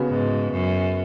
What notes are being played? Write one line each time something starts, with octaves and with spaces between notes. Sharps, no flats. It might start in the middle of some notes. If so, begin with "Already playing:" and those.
Already playing: C#3 B3 F#4
G#2
F#2